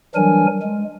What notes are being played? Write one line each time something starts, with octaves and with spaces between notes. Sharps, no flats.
E3 F#3 G3 D4 A#4 G#5
G#3